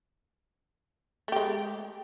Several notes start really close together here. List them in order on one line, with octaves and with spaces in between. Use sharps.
A3 G4 G#3